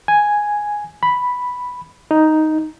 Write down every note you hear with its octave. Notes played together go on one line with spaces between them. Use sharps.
G#5
B5
D#4